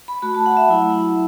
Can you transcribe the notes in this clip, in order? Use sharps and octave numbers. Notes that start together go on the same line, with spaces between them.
B5
A3 F#4 B5
A5
F#5
E5
F#3 A3 E4